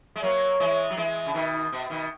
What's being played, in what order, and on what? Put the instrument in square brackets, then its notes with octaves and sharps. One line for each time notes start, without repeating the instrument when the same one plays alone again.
[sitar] G#3
[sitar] F#3 A#3 [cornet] C#5
[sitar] E3 G#3
F#3
E3 G#3
C#3
B2 D#3
B2
B2 D#3